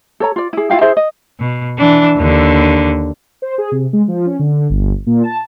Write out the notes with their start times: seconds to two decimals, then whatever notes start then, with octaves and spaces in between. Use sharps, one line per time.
0.20 A4 C#5 A#5
0.36 F4 D5
0.53 E4 G#4
0.70 E4 F4 F5 G5
0.81 E4 G#4 C5 E5
0.97 D#5
1.40 B2
1.78 E3 D4
2.17 D#2 D3
3.42 C5
3.58 G#4
3.72 C3
3.93 G#3
4.08 F3
4.26 C#4
4.39 D3
4.70 G1
5.06 A#2
5.23 A5